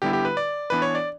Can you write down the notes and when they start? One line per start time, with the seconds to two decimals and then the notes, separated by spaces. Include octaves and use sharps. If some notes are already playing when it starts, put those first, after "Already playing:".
0.02 D3 G3 B3 E4 G4
0.13 G4
0.25 B4
0.37 D5
0.70 E3 B3 D4 B4
0.82 C#5
0.95 D5